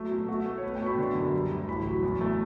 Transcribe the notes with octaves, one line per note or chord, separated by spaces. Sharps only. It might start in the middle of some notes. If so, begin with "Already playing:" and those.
Already playing: F#3 A3
B2
A3 F#4
A3
C#5
B3 B4
G5
B2 C#6
B5
D3
F#2
G3
D2
A1 B5
F#3
E2
A3